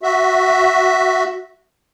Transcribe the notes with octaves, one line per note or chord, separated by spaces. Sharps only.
F#4 E5